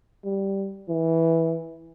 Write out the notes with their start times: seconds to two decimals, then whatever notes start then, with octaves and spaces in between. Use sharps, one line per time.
0.24 G3
0.89 E3